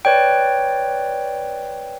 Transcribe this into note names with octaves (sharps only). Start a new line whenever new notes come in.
B4 C#5 D5 G5